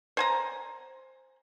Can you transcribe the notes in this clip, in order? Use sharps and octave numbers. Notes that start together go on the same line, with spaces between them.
C5 G#5 A#5